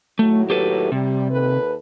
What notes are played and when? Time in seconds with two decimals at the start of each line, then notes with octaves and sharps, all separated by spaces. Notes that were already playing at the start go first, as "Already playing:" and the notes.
0.19 D#2 A2 F#3 A3
0.50 G4 A4 B4
0.92 C3 G3
1.31 D#2 A4 B4